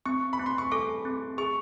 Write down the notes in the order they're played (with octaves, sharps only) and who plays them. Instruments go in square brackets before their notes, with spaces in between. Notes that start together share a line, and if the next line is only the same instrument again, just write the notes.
[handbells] C4 [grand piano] C#6
[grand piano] B5
[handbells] C4
[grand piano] C6
C#6
[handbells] A4 [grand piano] D6
[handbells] C4
[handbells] G#4 [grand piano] C#6